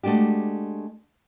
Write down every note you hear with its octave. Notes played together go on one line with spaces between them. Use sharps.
G#3 A3 D4 F#4 G4